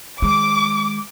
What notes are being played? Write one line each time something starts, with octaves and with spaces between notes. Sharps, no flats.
D#3 G#3 D6